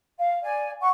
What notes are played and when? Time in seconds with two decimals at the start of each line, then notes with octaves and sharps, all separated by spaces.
0.18 F5
0.42 D5 G#5
0.80 F#5 C#6